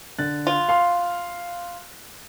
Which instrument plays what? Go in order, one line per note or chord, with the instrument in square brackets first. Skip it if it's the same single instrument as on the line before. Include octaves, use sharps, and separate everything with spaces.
[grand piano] D3 F#6 A6
[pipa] F4
[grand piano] F5 C6